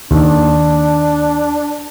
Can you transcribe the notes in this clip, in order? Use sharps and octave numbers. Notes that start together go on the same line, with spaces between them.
D#2 D4